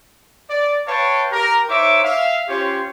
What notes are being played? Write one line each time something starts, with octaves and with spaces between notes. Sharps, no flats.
D5
B4 C#5 F5 G5 A5 C#6
G4 A#4
D#4 C5 C#5 E5 D6
E5 F5
C#4 F4 G4 C5 C#5 F5